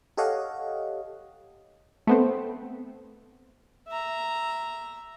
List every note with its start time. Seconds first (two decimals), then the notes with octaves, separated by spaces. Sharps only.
0.17 G4 A4 C#5 D#5 F5 F#5
2.07 A3 B3 C4
3.88 E5 A#5